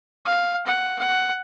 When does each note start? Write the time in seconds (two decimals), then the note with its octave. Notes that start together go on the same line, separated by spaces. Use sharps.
0.25 F5
0.66 F#5
0.99 F#5